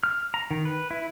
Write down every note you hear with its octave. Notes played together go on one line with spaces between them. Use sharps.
F6
A#5
D#3
B4
E4